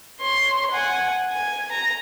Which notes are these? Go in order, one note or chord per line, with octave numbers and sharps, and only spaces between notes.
C#5 C6
F#5 G#5
G#5
A#5